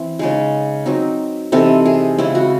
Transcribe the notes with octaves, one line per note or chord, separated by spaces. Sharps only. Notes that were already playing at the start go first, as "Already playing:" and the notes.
Already playing: E3 C4
C#3 G#3 D#4 G#4
F#3 C4 D#4
C3 E3 C4 D#4 A4
G#4
C#3 G#3 C4 E4
F#4